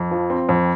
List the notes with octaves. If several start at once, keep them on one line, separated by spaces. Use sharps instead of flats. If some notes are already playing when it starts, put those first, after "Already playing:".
Already playing: F2
F3
C4
F2